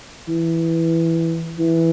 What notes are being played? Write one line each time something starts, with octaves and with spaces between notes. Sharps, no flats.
E3
E3